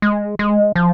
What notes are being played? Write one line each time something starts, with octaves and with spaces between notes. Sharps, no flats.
G#3
G#3
F3